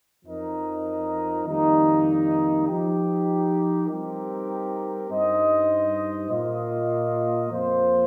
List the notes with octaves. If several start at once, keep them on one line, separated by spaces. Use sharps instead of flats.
F2 F3 D#4 A#4 D#5
F2 D#3 G3 A#3 D#4
F3 D#4 G4
G3 C4 D#4 G4 A#4
G2 G3 D#4 C5 D#5
A#2 A#3 F4 D#5
F2 F3 A#3 F4 C5